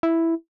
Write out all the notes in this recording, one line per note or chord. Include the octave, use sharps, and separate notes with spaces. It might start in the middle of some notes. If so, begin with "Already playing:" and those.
E4